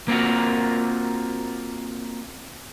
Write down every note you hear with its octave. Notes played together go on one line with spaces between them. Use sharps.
A#3 C4 F4 F#4 A#4